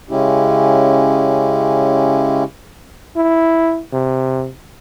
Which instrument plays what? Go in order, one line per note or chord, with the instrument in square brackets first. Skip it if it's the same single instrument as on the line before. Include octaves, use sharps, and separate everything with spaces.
[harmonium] C#3 G#3 C#4 E4 G4
[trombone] E4
C3